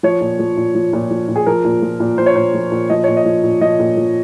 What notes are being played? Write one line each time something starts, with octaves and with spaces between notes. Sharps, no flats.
F3 C#5
A#2
F3
A#2
F3
A#2
F3
A#2
G#4
F3 A#4
A#2
F3
A#2
F3 C5
C#5
A#2 C5
F3
A#2
F3 D#5
A#2 C#5
D#5
F3
A#2
F3 D#5
A#2
F3